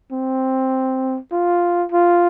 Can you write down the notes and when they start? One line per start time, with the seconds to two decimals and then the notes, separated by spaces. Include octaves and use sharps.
0.12 C4
1.32 F4
1.92 F4